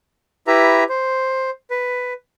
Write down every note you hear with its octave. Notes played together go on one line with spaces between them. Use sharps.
E4 G4 B4 E5 A#5
C5
B4